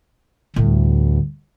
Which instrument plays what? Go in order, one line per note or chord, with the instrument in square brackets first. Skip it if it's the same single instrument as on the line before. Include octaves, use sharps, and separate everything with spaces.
[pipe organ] D2 [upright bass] A2 G3